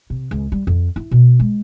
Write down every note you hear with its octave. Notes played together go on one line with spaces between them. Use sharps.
C3
C#2
G3
F2
E4
B2
G#3